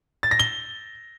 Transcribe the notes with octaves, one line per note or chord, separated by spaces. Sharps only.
A6
A#6
G7